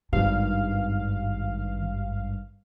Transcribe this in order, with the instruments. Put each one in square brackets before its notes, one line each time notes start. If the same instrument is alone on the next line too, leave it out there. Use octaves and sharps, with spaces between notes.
[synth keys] G#1 G2 F5 [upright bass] D#3